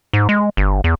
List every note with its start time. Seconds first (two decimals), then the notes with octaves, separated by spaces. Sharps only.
0.13 G#2
0.29 G#3
0.57 G1
0.84 E2